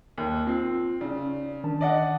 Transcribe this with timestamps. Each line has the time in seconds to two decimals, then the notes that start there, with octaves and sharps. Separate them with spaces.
0.18 D#2
0.47 C4 F4
1.01 C#3 D#4 D5
1.64 D#3 D4 A5
1.81 D5 D#5 F#5